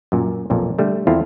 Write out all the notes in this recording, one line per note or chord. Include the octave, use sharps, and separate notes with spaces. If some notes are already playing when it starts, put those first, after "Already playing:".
F#2 A#2
B1 F2 A#2
D3 G3 A3
E2 C4 E4 F4 A4 F5